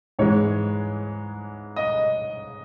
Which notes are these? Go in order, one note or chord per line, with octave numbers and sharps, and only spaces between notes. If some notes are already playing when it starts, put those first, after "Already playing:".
G#2 E3 G#3 C#5
D#5